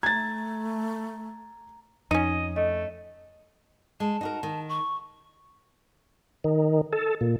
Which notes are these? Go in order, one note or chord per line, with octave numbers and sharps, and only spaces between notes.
A3 A#5 G#6 A6
F2 C#4 D#4 D#5
A3 D#5
G#3 A5
D#4 F#4 A#4
D#3
C#6
D#3
A4
A#2